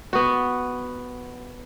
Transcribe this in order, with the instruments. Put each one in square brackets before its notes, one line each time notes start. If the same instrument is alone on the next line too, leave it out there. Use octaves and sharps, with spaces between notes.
[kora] B3 F#4